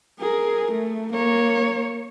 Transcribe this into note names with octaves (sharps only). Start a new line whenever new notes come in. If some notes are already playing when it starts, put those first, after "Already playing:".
G#4 A#4
A3
A#3 C#5